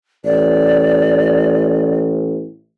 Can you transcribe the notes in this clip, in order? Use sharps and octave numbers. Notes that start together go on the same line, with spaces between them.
A1 D5